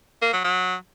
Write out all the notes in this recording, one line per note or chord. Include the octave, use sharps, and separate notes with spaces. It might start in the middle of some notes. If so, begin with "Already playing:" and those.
A#3
F#3
F#3